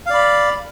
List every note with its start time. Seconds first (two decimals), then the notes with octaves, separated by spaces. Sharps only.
0.06 F5
0.10 D5
0.14 B5